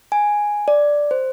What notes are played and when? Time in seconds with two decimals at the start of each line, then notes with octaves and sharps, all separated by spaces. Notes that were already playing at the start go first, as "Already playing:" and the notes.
0.12 G#5
0.68 D5
1.11 C5